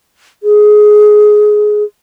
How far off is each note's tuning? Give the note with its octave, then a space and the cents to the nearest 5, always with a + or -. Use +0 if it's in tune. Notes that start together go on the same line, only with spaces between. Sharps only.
G#4 +15